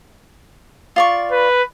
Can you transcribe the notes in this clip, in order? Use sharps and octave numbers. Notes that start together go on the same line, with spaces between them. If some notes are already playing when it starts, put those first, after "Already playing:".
F4 D5 C#6
B4